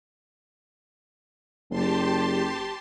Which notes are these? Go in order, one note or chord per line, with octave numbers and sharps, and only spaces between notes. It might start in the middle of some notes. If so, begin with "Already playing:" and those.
F#1 G4 A5 C6